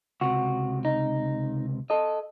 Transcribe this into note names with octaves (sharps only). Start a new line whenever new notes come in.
C#2 C3 F#4
D#4
A4 D#5